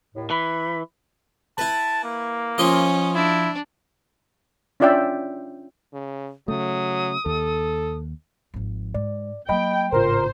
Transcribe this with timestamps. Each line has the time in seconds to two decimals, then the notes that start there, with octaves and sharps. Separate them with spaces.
0.14 D#2 A2
0.30 E3 B5
1.58 E4 B4 A5
2.04 A#3
2.58 F3 C#4 F4 D#5
3.15 D4 E4
4.80 C#4 D4 F4 D5 E5 G5
5.93 C#3
6.48 C#3 F#3 A3 D#6
7.26 D#2 A4
8.54 G#1 F3
8.94 G#2 D5
9.49 F#3 A#3 D#5 G5 B5
9.92 G#1 A2 C#3 D4 F4 A#4 C5